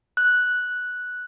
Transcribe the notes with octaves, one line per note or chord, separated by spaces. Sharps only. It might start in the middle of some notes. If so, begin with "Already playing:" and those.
F#6